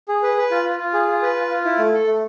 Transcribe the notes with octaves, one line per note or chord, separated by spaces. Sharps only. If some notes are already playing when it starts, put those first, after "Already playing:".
G#4
B4
B4
F4
F4
F4
G#4
F4
B4
F4
F4
E4
A3
A4
A3